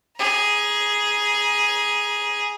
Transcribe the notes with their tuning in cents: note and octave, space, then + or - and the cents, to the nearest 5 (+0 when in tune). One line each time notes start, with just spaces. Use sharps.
G#4 +0 A#5 +35